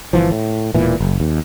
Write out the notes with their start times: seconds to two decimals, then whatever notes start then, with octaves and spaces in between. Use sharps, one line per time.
0.13 G1 E3 F3
0.31 A2
0.75 E1 A#2 E3
1.00 F#1
1.20 D#2